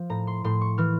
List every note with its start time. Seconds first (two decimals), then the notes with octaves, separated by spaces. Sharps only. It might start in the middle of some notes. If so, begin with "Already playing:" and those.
Already playing: F3
0.10 A2 A#5
0.27 C6
0.44 A2 C6
0.61 C#6
0.78 E3 F6